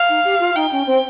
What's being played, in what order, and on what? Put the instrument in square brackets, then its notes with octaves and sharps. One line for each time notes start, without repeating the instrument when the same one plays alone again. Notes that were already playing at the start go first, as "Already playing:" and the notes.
Already playing: [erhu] F5
[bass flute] D#4
G4
F4
[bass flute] D#4 [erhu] G5
[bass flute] C#4
C4